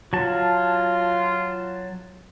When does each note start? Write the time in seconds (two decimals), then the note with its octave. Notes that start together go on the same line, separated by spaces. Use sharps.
0.13 F#3 F4 A5